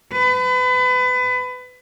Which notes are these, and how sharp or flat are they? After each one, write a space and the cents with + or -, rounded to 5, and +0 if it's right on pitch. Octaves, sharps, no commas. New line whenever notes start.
B4 +30